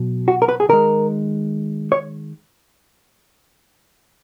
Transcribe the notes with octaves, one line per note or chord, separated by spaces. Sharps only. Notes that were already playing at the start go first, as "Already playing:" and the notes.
Already playing: B2 F#3
F#4
A#4
B4
G#4
D#3 G#3 A#4
C#5